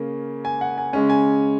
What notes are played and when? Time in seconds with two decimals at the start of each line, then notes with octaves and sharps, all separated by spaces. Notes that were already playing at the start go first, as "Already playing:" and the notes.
Already playing: C#3 A#3 C#4
0.45 G#5
0.61 F#5
0.78 G#5
0.93 C#3 G#3 C#4
1.10 G#5